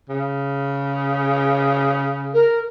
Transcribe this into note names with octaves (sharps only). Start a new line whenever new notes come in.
C#3
A#4